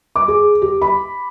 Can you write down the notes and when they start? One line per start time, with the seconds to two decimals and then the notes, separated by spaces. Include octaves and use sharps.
0.16 D6
0.28 G#4
0.62 G4
0.82 B5